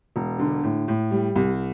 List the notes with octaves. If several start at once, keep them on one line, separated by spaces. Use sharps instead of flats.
E1
D3
A2
A2
G3
C2